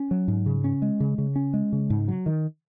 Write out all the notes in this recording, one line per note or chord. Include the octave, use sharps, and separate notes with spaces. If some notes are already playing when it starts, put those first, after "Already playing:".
Already playing: C#4
F#3
G#2
C#3
C#4
G#3
C#3
C#3
C#4
G#3
C#3
G#2
F#3
D#3